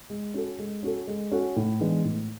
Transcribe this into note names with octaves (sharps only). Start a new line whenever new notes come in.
G#3
C#4 F#4 A4
G#3
C#4 F#4 A4
G#3
C#4 F#4 A4
A2
E3 G#3 B3 D4
A2